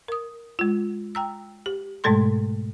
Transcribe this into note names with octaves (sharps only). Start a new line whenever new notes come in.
A#4 D#6
G#3 F4
G5 A#5 E6
G4
G#2 B2 G#3 A3 A4 C6